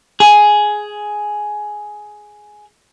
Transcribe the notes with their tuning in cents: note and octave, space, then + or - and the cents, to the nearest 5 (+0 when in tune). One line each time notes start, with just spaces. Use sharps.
G#4 +10